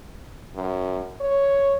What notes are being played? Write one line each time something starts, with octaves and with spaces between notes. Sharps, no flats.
F#2
C#5